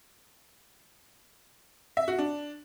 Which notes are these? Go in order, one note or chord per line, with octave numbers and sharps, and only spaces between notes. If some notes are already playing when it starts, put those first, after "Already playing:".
E5
F#4
D4